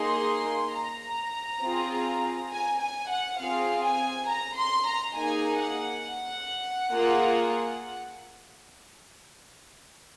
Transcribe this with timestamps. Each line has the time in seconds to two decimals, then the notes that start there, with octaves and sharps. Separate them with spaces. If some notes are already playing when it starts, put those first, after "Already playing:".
Already playing: A#3 D#4 G#4 C6
0.75 A#5
1.63 C4 F4 G#4
2.52 G#5
2.81 G#5
3.10 F#5
3.39 C4 F4 G#4 F5
3.83 G#5
4.28 A#5
4.57 C6
4.87 A#5
5.16 A#3 D#4 G#4 G#5
5.60 F#5
6.93 A#3 F4 G#4